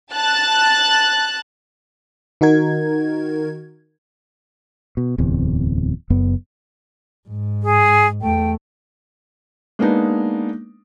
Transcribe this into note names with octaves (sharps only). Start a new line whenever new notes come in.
A5 F#6 A6
D#3 D#4 F#4 A#4 G#6
B2
D1 E2 C3
F#1 F#2 B3
G#2
G#4
E2 A3 G5
G#3 A#3 B3 D4 D#4